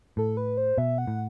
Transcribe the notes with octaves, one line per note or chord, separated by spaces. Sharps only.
A2 A4
B4
C5
B2 E5
F#5
A2